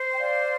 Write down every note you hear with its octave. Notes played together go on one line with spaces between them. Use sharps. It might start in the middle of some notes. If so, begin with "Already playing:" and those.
Already playing: C5
G5
D5 F5